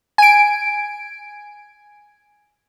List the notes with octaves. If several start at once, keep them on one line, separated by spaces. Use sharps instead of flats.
G#5 D7